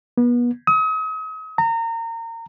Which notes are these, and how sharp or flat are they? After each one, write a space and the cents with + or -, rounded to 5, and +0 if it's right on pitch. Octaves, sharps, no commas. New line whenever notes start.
B3 -30
D#6 +40
A#5 -30